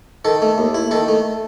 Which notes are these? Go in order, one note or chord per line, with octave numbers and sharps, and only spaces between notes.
D#3 A4
A3
D#2
E4
D#3 A4
A3